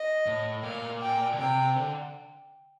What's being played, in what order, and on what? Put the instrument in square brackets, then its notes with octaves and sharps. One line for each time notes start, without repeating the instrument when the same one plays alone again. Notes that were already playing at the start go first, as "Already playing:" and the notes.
Already playing: [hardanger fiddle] D#5
[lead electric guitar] A2
[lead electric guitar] A#2 [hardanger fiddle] F5
[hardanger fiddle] G5
[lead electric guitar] D3
[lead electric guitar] C3 [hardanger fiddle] G5
[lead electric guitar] D3